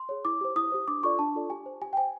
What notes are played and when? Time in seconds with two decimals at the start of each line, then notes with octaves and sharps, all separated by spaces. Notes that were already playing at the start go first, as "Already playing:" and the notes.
Already playing: C6
0.09 G#4 C#5
0.25 E4 D6
0.41 G4 C5
0.56 E4 D#6
0.72 G4 C5
0.88 D4 D6
1.03 F4 A4 D5 C#6
1.19 D4 A5
1.35 F4 A4 D5
1.50 G4 G#5
1.66 C5
1.82 G4 G#5
1.93 G5
1.97 C5 G#5